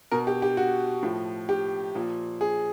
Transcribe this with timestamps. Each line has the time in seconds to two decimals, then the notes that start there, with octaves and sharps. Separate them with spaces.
0.12 B2 A#4
0.27 G4
0.42 G4
0.57 F#4
1.03 A2 F3
1.49 G4
1.95 A#2 F3
2.41 G#4